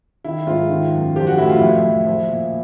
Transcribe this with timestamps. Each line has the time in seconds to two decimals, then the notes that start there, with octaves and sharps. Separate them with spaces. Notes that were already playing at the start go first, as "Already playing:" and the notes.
0.24 D#3 E4
0.47 G#2 F4
0.69 D#3
0.93 F#2
1.16 F3 G4
1.27 F#4
1.38 A2 E4
1.49 F4
1.61 F2 E4
1.83 F2
2.06 F3
2.29 A#2